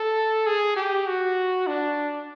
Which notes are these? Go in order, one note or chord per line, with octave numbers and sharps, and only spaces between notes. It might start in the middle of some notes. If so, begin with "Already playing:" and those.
Already playing: A4
G#4
G4
F#4
D4